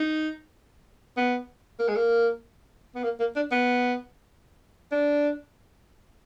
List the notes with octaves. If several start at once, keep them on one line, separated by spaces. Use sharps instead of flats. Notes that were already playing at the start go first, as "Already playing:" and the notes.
Already playing: D#4
B3
A#3
G#3
A#3
B3
A#3
A#3
D4
B3
D4